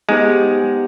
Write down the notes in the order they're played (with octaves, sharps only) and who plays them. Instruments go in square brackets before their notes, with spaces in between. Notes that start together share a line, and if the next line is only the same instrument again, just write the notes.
[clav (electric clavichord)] G#3 [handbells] B3 D#4 G4 C5